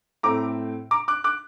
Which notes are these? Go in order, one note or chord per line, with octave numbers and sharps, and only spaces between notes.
A2 A3 C4 A#5 D6
A#5 D6
D6 F#6
D6 F#6